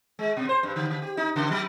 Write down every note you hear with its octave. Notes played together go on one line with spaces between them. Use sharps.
G#3
B2
C5
G2
D3
D3
G4
D#4
C#3
F#3